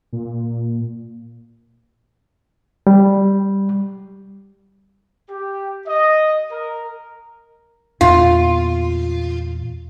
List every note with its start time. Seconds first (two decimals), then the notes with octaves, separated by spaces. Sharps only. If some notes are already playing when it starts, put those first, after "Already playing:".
0.13 A#2
2.87 G3
5.30 G4
5.87 D#5
6.51 A#4
8.01 E2 A#2 B3 F4